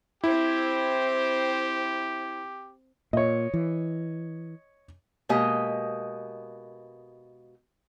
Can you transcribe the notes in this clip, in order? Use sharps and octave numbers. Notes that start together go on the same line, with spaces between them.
C4 E4 G4 C5
A#2 C#5 D#5
E3
B2 G#3 A#3 G4 D#5